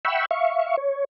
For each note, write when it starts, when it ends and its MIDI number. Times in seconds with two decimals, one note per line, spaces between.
0.05 0.25 76
0.05 0.25 78
0.05 0.25 79
0.05 0.25 83
0.05 0.25 85
0.05 0.25 88
0.31 0.76 76
0.31 0.76 77
0.31 0.76 85
0.77 1.04 73